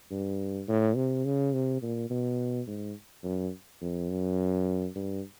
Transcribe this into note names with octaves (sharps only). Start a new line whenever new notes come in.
G2
A2
C3
C#3
C3
A#2
B2
G#2
F#2
F2
F#2
G2